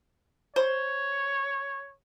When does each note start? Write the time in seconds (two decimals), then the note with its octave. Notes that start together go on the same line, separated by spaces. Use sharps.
0.56 C5 C#5